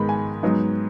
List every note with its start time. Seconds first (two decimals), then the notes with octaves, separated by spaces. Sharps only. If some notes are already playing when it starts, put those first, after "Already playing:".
Already playing: G#2 D#3 G#3 B3 D#4 B5
0.09 G#5
0.43 G#2 F#3 B3 D#4